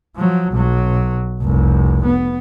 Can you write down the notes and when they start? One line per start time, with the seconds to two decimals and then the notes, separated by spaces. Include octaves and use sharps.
0.16 F3 F#3
0.52 B1 F#3
1.41 F1 C2
2.05 B3